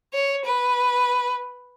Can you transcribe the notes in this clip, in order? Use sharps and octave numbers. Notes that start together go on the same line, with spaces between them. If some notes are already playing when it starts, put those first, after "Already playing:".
C#5
B4